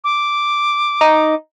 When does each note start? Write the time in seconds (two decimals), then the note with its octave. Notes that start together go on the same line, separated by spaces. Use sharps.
0.04 D6
1.01 D#4